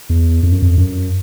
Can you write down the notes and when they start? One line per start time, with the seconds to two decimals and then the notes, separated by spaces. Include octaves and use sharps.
0.10 E2
0.43 F2
0.52 F#2
0.62 F2
0.78 F#2